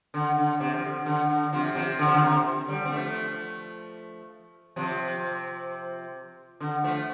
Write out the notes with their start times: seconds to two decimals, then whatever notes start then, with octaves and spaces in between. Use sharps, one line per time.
0.14 D3
0.37 D3
0.60 C3
0.74 F3
0.84 D3
1.06 D3
1.29 D3
1.52 C3 F3
1.75 C3 F3
1.99 D3
2.07 F3
2.14 D3
2.21 C3
2.68 D3 G3
2.85 C4
2.91 F3 A3
4.76 C3 F3
6.60 D3
6.84 F3 A3